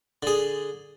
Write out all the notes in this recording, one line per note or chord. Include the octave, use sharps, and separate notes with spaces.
D3 G#4